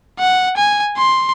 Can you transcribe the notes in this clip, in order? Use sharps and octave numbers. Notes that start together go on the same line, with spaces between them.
F#5
G#5
C6